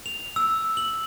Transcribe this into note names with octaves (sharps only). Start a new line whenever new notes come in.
F7
E6
F#7